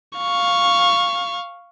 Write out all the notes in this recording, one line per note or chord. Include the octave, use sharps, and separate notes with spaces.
F5 C#6